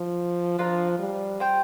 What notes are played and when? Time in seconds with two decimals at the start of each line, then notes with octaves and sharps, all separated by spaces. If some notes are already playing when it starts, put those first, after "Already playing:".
Already playing: F3
0.59 F3 D4 F4 A#4
0.99 G3
1.40 F4 C5 G5